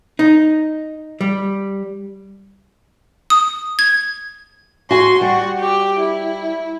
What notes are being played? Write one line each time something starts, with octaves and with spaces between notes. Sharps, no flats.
D#4
G3
D#6
G#6
F#4 G#5 C6
G3 F#4
G4
E4